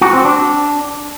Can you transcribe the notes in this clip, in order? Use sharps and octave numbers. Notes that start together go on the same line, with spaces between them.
F#4
C4
D4